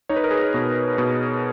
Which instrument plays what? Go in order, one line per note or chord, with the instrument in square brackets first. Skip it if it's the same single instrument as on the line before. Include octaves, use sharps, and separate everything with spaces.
[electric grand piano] D#4 C#5
B4
A#4
G#4 B4
B2
B2